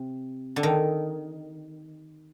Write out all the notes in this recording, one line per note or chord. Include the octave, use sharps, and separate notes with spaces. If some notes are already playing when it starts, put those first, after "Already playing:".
Already playing: C3
D3
D#3